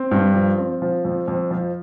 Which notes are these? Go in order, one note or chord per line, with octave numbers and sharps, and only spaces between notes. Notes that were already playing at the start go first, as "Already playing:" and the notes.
Already playing: C4
G2
F3
C4
F3
F2
F2
F3